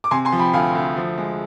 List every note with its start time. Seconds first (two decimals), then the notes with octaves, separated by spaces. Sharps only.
0.04 D6
0.11 C3 G#5 C6
0.25 G#5 C6
0.32 F3
0.39 G5 B5
0.54 D2 F5 G#5
0.75 D2
0.97 F3
1.18 G#3